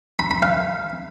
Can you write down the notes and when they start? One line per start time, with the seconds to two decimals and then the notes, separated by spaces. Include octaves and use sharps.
0.19 B5
0.31 B5
0.42 F5